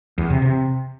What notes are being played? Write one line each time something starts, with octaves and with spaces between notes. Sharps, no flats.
E2
C3
C3